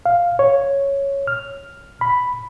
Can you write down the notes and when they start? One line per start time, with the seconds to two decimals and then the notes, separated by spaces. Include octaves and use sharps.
0.06 F5
0.39 C#5
1.27 F6
2.01 B5